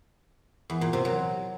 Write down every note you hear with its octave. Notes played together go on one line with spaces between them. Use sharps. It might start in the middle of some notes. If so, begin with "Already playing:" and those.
E2
A#2
C3
F#3